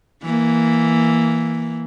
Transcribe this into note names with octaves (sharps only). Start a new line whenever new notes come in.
E3 A#3